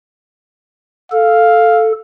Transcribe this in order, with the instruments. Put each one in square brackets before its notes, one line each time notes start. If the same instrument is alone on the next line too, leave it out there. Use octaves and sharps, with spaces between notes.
[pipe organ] A4 [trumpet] F5